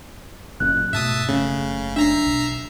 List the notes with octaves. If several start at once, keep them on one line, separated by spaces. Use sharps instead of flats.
F#1 A#2 C#3 F#6
G#2 B2 A3 E5 A5 D#6
F#1 C#3 A3 C#4
D4 E5 A#5 C7
B1